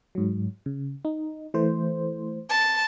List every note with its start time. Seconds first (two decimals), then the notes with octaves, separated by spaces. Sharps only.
0.15 G#2 F#3
0.66 C#3
1.05 D#4
1.54 E3 A3 C5
2.50 A5